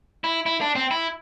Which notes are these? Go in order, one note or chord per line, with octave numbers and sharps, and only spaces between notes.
E4
E4
D4
C4
E4